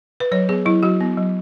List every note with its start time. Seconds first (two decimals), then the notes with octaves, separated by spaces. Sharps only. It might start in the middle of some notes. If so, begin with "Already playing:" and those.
0.20 B4
0.32 F#3 C#5
0.49 B3 G#4
0.66 F#3 E4
0.83 F#3 F#4
1.00 B3
1.17 F#3